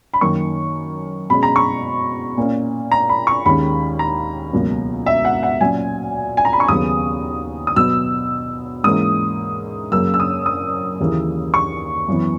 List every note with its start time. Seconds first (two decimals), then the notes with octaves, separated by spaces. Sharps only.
0.14 B5
0.21 F#2 D#3 A#3 C#6
1.30 B2 G#3 C#4 B5
1.43 A#5
1.56 C#6
2.38 A#2 A#3 C#4
2.92 A#5
3.09 B5
3.27 C#6
3.46 D#2 D#3 G#3 C#4 B5
3.99 A#5
4.53 C#2 B2 F#3 A#3
5.06 E5
5.25 F#5
5.43 F#5
5.61 A#2 F#3 C#4 G#5
6.37 G#5
6.45 A#5
6.53 B5
6.60 C#6
6.68 D#2 C#3 F#3 B3 D#6
7.67 D#6
7.76 B2 F#3 B3 E6
8.84 G#2 E3 A#3 C#4 D#6
9.92 F#2 C#3 F#3 A#3 E6
10.14 E6
10.20 D#6
10.46 D#6
11.00 D#2 C#3 E3 A#3
11.54 C#6
12.08 F#2 E3 B3